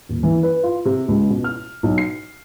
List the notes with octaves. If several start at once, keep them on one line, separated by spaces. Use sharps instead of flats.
D#1
E3
B4
F4
C3
C#2
B2
F6
B1
C7